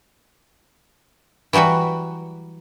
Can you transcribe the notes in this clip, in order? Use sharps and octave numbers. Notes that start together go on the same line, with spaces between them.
E3 F#3 G3 F#4 B4